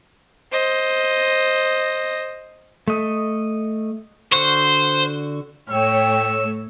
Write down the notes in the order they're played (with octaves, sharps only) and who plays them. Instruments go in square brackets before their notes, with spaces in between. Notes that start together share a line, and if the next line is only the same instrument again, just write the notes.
[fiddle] C5 D#5
[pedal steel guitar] A3 D#5
[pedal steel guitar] D3 F#4 C#6 [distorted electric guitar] C5
[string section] A2 A3 [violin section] C#5 [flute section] G5 [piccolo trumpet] E6